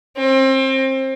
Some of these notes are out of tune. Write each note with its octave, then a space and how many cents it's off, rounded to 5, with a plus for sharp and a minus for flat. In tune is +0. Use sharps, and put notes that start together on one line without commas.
C4 +30